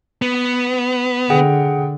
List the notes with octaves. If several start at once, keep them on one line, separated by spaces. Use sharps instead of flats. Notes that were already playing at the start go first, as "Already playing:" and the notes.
B3
D3 G#4 F#5 G5